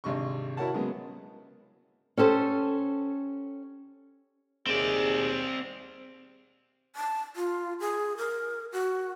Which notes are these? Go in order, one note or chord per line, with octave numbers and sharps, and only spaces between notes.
G#1 C3 D4 D#5 C#6
E4 F#4 A#4 C#5 F#5 A5
C#3 F#3 G#3 A#3 B3
C#4 G4 A4 C5
D#2 C4 G#4 D5
A5
F4
G#4
A#4
F#4